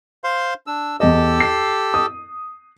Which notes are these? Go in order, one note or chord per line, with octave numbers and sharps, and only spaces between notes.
C5 F5 C6
D4 E6
E2 G4 A4 D#5 E6
C7
D#6